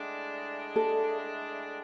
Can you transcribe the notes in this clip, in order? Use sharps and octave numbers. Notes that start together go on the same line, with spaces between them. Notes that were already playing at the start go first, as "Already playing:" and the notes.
Already playing: A2 G#3 D4
A4